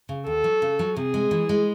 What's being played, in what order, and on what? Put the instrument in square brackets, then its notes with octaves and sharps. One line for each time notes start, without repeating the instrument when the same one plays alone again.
[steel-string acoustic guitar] C#3
[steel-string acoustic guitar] D#2 [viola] A4
[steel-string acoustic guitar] F#3
C#3
F#3
[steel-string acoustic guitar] C3 [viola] G#4
[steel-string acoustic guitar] G#3
E3
G#3